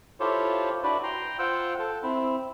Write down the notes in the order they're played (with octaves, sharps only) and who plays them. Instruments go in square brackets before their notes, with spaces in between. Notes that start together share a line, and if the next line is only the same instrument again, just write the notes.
[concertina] E4 F4 G4 A4 C5 C#5
D4 E4 F#4 B4 D5
G5 A#5 C6
F4 C5 F#5 G5 E6
A4
C4 E4